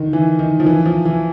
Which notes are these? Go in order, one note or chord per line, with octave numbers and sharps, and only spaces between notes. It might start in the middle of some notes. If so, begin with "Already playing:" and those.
Already playing: D3 D#3
E3
D#3
F3
E3
F3
E3